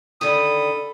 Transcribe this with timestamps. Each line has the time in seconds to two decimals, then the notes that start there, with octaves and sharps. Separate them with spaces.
0.21 D3 D#3 A4 B5 D#6